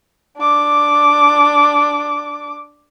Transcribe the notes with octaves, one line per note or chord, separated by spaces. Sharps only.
D4 D6